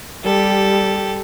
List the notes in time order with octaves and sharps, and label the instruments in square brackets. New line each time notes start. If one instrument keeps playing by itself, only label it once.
[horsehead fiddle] G3 [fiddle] G4 A4